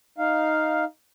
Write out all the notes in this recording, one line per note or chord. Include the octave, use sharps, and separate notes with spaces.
D#4 F5